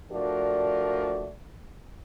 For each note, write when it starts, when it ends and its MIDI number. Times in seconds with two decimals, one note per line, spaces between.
0.12 1.29 53
0.12 1.29 57
0.12 1.29 62
0.12 1.29 66
0.12 1.29 70
0.12 1.29 74